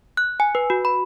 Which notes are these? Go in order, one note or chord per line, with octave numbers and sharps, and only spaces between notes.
F#6
G#5
B4
F#4
B5